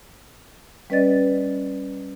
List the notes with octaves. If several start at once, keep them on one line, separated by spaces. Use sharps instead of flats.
G3 C#4 B4 D5 D#5 A6